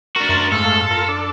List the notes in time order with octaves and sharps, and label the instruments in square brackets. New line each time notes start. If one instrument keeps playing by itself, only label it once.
[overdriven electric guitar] D4 F#4 [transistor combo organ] A#4
[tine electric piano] F#2 C6 A6
[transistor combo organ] G#2 A3 F5 [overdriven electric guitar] A4
[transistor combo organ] F4 A#4
D4 A4